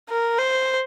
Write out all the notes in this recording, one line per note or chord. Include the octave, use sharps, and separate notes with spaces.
A#4
C5